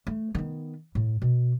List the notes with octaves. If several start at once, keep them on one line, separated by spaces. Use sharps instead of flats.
A3
D#3 B3
A2
B2